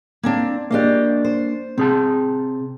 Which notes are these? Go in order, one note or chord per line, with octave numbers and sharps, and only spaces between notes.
A#3 C4 D4
A#3 D4 G4 D#5 F5
C5
C3 C4 G#4 A5